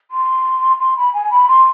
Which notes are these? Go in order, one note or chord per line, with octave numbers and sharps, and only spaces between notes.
C6
C6
B5
G#5
B5
C6